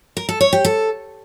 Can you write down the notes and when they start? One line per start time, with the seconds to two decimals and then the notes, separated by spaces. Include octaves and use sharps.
0.17 A#4
0.29 A4
0.41 C#5
0.53 G4
0.65 A4